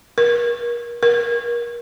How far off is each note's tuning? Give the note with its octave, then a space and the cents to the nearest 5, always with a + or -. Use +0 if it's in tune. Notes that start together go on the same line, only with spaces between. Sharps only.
A#4 +35
A#4 +30